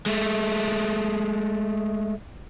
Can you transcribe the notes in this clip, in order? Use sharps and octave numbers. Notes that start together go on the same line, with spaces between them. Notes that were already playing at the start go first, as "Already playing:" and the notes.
G#3 A3